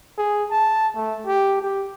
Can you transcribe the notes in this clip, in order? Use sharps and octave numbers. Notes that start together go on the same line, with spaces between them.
G#4
A5
A3
G4
G4